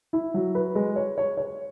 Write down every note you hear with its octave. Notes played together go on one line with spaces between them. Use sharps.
E4
F#3
B4
G#3
C#5
C#5
C#5